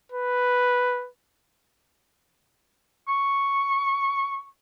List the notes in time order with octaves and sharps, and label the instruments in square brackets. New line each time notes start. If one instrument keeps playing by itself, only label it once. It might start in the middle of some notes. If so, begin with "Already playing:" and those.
[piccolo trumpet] B4
[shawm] C#6